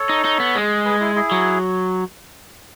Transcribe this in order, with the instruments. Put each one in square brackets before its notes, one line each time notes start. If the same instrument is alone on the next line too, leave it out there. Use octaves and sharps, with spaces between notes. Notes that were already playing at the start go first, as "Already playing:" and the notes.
Already playing: [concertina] A4 C#5
[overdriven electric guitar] D#4
D#4
B3
G#3
[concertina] G#4 B4
E4
E4 G#4
[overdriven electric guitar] F#3